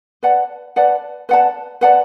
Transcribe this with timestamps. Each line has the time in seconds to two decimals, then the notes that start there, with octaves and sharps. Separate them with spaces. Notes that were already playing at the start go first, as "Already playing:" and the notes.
0.23 B4 D5 F#5 A5
0.76 B4 D5 F#5 A5
1.29 B4 D5 F#5 A5
1.81 B4 D5 F#5 A5